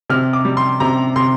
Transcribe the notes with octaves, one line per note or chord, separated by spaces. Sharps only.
C3 F6
D6
G3
C6
C3 A#5
C3 C6